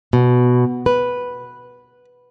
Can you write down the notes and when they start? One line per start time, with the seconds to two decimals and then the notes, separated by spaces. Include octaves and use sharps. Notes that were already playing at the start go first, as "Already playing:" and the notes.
0.13 B2
0.86 B4